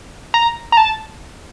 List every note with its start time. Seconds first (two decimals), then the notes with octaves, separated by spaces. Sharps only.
0.34 A#5
0.72 A#5
0.77 A5